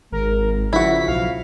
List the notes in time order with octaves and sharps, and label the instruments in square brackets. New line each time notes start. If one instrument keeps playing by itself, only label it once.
[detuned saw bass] G#1 [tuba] G#3 [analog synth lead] A#4
[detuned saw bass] C#3 [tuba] F3 [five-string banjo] E4 F#4 [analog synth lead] B6
[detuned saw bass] B1 [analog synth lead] F5